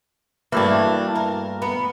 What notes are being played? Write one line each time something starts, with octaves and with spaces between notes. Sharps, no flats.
G2 E3 F#3 A3 A#3 D4
A#4
B3